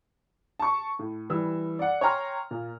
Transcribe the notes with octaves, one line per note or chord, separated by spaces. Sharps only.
A5 C#6
A2
E3 G3 E6
D5 F#5
C#5 G5 G#5 A#5 C6 F6
A#2